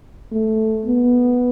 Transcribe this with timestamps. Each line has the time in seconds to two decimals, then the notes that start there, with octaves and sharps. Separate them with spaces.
0.31 A3
0.85 B3